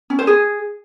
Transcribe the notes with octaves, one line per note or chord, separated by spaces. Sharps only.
C#4
C5
G#4